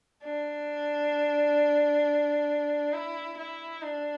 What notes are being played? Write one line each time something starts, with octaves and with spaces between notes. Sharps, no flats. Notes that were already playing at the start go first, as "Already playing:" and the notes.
D4
E4
E4
D4